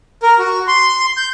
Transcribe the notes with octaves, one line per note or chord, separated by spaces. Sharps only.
A#4
F#4
C6
G6